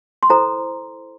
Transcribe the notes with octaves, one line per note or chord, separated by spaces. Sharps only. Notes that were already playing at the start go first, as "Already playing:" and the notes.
C6
E4 A4 C5 A#5